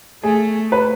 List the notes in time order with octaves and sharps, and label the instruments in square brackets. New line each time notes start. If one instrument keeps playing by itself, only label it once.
[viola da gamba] A3 [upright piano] G#4
[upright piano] B4